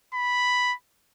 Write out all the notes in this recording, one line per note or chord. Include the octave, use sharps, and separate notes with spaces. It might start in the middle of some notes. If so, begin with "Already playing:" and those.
B5